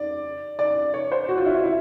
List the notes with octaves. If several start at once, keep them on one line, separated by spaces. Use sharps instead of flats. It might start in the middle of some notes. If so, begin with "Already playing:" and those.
Already playing: D5
D5
C#5
C5
F#4
F4
E4
E4